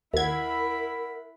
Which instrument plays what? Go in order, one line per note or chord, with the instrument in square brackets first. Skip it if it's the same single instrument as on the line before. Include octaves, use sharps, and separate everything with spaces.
[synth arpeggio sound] D#2 G#6 [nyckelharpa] E4 B5 [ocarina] A#4 [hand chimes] E5 F#5